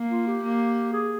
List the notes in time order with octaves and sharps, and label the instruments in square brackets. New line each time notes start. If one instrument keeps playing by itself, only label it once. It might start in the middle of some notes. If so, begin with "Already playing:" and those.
Already playing: [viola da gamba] A#3
[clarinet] F4
G4
[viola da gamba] A#3
[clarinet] G#4